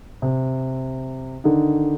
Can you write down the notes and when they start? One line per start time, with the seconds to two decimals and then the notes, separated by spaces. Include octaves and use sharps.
0.22 C3
1.44 D3 D#3 D#4